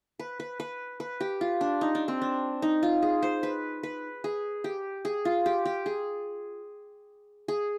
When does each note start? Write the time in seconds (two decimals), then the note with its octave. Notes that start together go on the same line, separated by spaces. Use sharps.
0.19 B4
0.40 B4
0.60 B4
1.00 B4
1.21 G4
1.41 F4
1.61 D4
1.81 D#4
1.95 D4
2.08 C4
2.22 D4
2.62 D#4
2.83 F4
3.02 G#4
3.22 C5
3.43 B4
3.83 B4
4.24 G#4
4.64 G4
5.05 G#4
5.25 F4
5.46 G4
5.65 G4
5.86 G#4
7.48 G#4